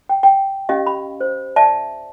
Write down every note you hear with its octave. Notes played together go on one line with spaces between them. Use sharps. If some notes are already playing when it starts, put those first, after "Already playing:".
G5
G5
C#4 G4 D#5 F5
B5
C5
D5 E5 A5